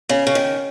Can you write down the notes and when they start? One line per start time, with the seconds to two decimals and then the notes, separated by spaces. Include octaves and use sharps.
0.09 C#3 C#4
0.27 C#3
0.35 D#3